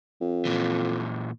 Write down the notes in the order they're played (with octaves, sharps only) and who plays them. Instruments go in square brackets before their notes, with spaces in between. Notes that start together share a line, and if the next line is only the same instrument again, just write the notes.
[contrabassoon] F2
[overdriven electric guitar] A#2 E3